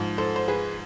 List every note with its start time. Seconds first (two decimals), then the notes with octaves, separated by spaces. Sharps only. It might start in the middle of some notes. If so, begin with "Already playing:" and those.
Already playing: G#2 F3
0.18 A4 C5
0.36 C5
0.48 G#4 B4